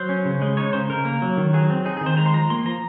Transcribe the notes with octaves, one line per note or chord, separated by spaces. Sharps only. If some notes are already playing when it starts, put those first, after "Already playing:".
Already playing: F#3 C5
C#4
C#3
G#3
D#4 C#5
C#3 C5
C#3 A#4
A#3
F#3
D#3
F#3 G#4
C4
D#4 G#4
D#3 G#4
C5
G#3 A#5
C6
F3 A#5
A#3 C6
F3 A#5